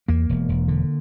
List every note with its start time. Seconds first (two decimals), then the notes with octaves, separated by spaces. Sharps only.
0.08 E2 A#3
0.29 E1
0.49 E1
0.68 D3